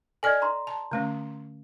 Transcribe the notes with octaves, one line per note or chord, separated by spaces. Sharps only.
A4 D5 D#5 G#5 F6 G#6
A#5 C6
A5
D3 A3 C#4